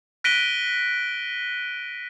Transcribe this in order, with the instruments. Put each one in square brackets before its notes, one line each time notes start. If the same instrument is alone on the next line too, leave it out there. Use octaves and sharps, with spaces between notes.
[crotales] F#6 A#6 B6 D7 D#7 G7